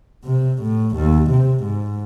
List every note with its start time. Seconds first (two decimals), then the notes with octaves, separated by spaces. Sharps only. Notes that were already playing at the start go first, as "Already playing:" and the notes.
0.24 C3
0.62 A2
0.96 D#2
1.30 C3
1.64 G#2